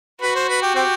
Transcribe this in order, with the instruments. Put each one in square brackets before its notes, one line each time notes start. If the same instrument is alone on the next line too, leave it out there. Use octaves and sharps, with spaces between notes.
[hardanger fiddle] F#4 [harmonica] B4
[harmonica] C5
B4
G4
C4 G4